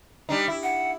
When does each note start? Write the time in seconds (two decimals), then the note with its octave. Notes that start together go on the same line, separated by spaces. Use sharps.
0.29 G3 D4 D#4
0.48 E4
0.63 F#5